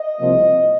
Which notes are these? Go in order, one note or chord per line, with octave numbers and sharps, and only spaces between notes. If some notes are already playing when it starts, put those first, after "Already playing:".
Already playing: D#5
C2 C3 F3 A#3